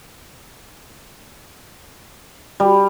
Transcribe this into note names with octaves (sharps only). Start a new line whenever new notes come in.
G3